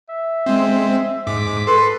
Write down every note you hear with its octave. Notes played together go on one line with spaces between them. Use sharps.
E5
G#3 C4
G#2 D6 B6
A4 B4 C6